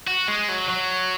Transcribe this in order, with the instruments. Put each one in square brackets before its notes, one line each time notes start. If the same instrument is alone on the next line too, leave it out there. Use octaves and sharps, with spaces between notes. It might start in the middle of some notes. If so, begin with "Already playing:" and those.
[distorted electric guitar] F#4
G#3
F#3
F#3